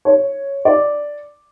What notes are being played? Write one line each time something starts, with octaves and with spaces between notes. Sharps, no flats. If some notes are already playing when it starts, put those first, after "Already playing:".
C#5
D5